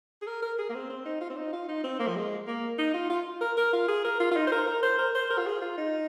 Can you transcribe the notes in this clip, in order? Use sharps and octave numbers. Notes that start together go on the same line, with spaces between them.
G#4
A#4
A#4
G#4
A#3
C4
C4
D#4
F4
C4
D#4
F4
D#4
C4
A#3
F3
G#3
A#3
D#4
F4
F4
A#4
A#4
F4
G#4
A#4
F4
F4
D#4
C5
A#4
A#4
C5
A#4
C5
A#4
F4
G#4
F4
D#4